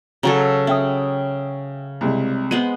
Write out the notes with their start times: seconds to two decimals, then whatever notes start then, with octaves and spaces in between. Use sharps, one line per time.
0.23 C#3 F#3 A4 C#5 G#5 A#5
0.67 C#4 E5 G5 D#6
2.01 C2 C3 G#3
2.51 G#3 B3 C5 D#7